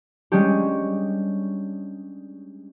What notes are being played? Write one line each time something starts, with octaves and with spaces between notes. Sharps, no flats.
G3 G#3 C#4 D4 G4